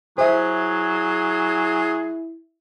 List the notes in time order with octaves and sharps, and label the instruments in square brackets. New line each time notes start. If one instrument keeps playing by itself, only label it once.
[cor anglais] F#3 [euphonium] E4 [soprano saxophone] G#4 [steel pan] C5 E5